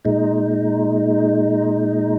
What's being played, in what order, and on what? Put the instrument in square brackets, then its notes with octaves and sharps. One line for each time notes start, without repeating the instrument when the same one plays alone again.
[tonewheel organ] A#2 G#3 D#4